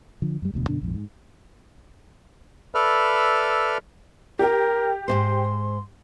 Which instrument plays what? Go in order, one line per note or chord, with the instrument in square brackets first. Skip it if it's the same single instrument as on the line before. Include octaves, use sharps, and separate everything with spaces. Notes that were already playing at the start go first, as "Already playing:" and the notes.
[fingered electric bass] D3 F3
F#2 G3
E1 D2 B2
F#2 B2 D3 D4
A#1 F2 G#2
G#2
[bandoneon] A4 B4 D5 E5 B5 F6
[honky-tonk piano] G4 G5 [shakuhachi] A#4
[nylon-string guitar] G#2 B2 C5 [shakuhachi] C6